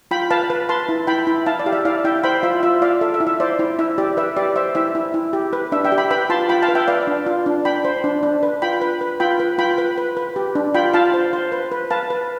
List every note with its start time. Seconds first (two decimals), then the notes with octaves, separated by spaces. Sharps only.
0.11 F4 G5 B5
0.31 B4 F5 A5
0.50 B4
0.69 B4 A5 C6
0.89 E4
1.07 E4 G5 B5
1.27 E4
1.46 E4 F5 A5
1.59 D5
1.66 G4 F5
1.73 E5
1.85 E4 D5 F5
2.04 E4 E5 G5
2.24 C5 G5 B5
2.43 F4 E5
2.63 F4 E5
2.82 F4 D5 F5
3.01 A4 E5
3.14 E5
3.20 E4
3.27 E5
3.40 C5 D5
3.59 E4
3.79 E4 E5
3.98 G4 D5
4.17 B4 E5
4.37 G4 D5
4.56 C5 E5
4.75 E4 E5
4.95 E4
5.14 E4
5.33 G4
5.53 B4
5.72 D4 E5
5.85 E5 G5
5.92 G4
5.98 G5 B5
6.11 B4 G5 B5
6.30 F4 A5 C6
6.49 F4 G5 B5
6.62 F5 A5
6.69 B4
6.75 E5 G5
6.88 B4 D5 F5
7.07 D4
7.26 F4
7.46 D4
7.65 D4 G5 B5
7.85 C5
8.04 D4
8.23 D4
8.43 B4
8.62 F4 G5 B5
8.81 B4
9.01 B4
9.20 F4 G5 B5
9.40 B4
9.58 F4 G5 B5
9.78 B4
9.98 B4
10.17 B4
10.36 G4
10.55 D4
10.74 F4 G5 B5
10.94 F4 F5 A5
11.14 C5
11.33 C5
11.52 B4
11.72 B4
11.90 B4 F5 A5
12.10 B4